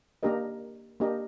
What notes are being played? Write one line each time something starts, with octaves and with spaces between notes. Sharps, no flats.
A#3 D4 G4 A#4 D#5
A#3 D4 G4 A#4 D#5